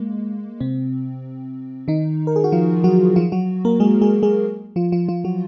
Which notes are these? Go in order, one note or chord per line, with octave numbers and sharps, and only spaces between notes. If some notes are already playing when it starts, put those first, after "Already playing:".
Already playing: G#3 A#3
C3 C4
D#3 D#4
A#4
G#4
F#4
F3 F4
F#3 F#4
F3 F4
F#3 F#4
A#3 A#4
G#3 G#4
G#3 G#4
G#3 G#4
F3 F4
F3 F4
F3 F4
F#3 F#4